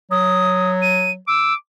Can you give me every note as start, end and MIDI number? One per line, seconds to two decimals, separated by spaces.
0.11 1.19 54
0.11 0.71 87
0.82 1.11 99
1.28 1.56 86
1.28 1.54 88